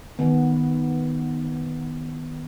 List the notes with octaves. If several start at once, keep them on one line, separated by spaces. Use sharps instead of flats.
D#3 B3